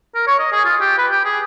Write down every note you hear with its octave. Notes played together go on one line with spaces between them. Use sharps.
A#4
C#5
D#5
G#4
F4
G4
B4
G4
G#4